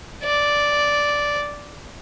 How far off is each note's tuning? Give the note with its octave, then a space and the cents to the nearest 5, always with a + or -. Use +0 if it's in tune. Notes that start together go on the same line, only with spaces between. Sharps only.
D5 -5